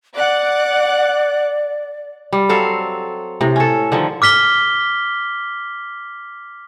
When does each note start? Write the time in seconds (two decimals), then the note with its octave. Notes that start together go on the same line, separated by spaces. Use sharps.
0.16 D5 F#5 D6 F#6
2.33 G3
2.49 F#3 C4 A4 F5
3.41 A2 C3
3.56 C#4 A4
3.92 D3 D#3 F3
4.22 D6 F6 B6 G7